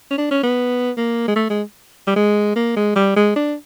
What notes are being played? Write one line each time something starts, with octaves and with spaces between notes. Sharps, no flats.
C#4
D4
C#4
B3
A#3
G#3
A3
G#3
G3
G#3
A#3
G#3
G3
G#3
D4